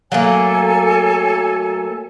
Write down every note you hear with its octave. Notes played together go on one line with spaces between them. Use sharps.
F#3 A3 A#3 A4 C#5 G#5